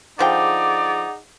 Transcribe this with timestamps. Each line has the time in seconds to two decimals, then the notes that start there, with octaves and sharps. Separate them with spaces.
0.19 D3 F3 D#4 G#4 D5 F#5 G5 D6